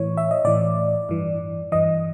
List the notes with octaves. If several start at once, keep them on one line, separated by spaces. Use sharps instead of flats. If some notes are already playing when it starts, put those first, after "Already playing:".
Already playing: A2 E3 C#5
E5
D#5
A2 E3 D5
G2 E3
G2 E3 D#5